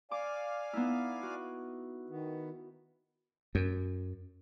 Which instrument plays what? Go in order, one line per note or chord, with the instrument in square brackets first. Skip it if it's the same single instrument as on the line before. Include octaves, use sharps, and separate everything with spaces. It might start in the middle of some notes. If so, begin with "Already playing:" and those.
[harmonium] D5 F5 G#5 [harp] D6
[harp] B3 D#4 E4
F#4
[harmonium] D#3 B3
[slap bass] F#2